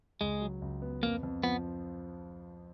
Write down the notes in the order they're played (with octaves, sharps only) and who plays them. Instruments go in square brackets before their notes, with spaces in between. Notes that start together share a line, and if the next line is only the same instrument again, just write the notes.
[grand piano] C#2 [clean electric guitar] G#3
[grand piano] F#3
C#2
B3
[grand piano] F2 [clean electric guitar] A#3
[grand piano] F2
[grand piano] F3 [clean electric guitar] B3